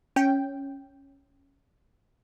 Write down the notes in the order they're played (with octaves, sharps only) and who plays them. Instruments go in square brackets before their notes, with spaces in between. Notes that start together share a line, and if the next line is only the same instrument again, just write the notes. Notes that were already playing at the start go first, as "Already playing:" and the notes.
[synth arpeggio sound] C#4 G5